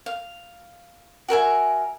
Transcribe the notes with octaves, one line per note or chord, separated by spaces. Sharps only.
F5
F#4 A#4 E5 G#5